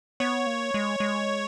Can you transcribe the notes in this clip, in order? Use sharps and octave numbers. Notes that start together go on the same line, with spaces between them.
B3 C#5
A#3
G#3
G#3